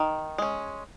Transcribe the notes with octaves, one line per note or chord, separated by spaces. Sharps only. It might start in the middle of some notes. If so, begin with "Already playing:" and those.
Already playing: D#3
G#3 C#4